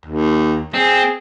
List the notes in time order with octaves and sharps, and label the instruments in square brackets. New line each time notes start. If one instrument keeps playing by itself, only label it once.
[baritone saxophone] D#2
[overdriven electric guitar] C4 [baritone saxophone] G#4